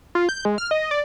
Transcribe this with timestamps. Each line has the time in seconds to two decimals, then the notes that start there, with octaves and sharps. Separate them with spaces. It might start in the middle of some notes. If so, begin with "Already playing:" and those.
0.15 F4
0.29 G6
0.45 G#3
0.58 F6
0.71 D#5
0.91 D5